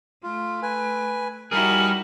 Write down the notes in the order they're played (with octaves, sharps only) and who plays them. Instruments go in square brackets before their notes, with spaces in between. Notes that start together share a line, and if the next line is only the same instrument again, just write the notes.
[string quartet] A3 [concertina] F4
[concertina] B4 G#5
[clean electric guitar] G3 G#4 [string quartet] D#4 E4 F#4 [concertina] A#4